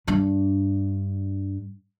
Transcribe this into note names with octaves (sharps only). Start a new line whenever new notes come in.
G2 D4